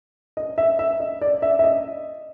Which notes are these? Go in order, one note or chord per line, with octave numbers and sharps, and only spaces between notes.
D#5
E5
E5
D#5
D5
E5
E5
D#5